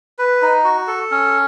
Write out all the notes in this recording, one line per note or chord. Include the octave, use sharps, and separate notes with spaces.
B4
D#4
F#4
A4
C#4